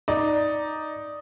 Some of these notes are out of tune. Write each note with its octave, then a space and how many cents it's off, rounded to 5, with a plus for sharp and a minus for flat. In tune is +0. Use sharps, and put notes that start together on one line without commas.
D#4 +0 D5 +0